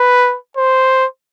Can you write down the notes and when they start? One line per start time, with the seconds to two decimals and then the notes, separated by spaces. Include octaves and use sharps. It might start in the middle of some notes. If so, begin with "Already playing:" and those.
Already playing: B4
0.57 C5